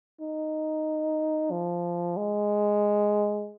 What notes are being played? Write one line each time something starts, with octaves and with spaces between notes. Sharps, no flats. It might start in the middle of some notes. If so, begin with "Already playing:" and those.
D#4
F3
G#3